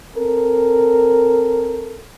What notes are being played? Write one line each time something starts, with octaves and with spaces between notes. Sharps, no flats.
C4 A4 A#4